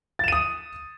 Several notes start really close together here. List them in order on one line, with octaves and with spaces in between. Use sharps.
A6 E7 D#7 D#6